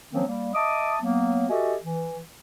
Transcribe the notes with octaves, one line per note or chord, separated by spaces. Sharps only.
D#3 F3 F#3 A#3 C4 C#4
G3 A#3
D#5 E5 A5 D6 D#6
F#3 A#3 B3
F#4 G4 A4 D#5 E5 G#5
E3